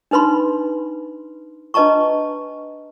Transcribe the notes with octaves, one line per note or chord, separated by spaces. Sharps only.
D4 D#4 B4 B5 C6
D4 B4 D#5 A5 A#5 C#6